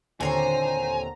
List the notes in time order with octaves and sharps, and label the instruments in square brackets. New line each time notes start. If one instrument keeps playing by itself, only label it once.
[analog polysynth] D#2 D3 A#5 [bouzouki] A#2 C4 C#5 [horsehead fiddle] C5 [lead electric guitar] G#5